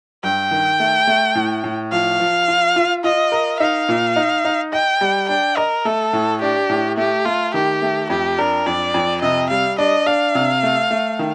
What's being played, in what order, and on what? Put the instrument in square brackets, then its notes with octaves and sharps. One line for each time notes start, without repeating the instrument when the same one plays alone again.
[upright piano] G2 [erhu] G5
[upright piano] D#3
A3
A3
A2
A2
[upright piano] F3 [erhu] F5
[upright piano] F3
F4
F4
[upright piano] F4 [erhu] D#5
[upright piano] A#4
[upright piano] D#4 [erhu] F5
[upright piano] A#2
D#4
D#4
[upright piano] D#5 [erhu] G5
[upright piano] G3
[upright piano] D4 [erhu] G5
[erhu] A#4 [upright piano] D#5
[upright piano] A3 [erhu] A4
[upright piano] A2
[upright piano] D4 [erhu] G4
[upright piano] A2
[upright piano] A3 [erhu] G4
[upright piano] A3 [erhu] F4
[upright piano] D#3 [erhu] G4
[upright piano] A3
[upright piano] F2 [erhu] G4
[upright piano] D4 [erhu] A#4
[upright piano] F2 [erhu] D5
[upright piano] F2
[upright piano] C3 [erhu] D#5
[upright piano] G3 [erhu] F5
[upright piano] D4 [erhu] D#5
[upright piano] D4 [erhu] F5
[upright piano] C3
A3
A3
D#3